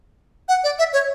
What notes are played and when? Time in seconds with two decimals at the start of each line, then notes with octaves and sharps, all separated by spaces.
0.48 F#5
0.64 D5
0.79 E5
0.93 C#5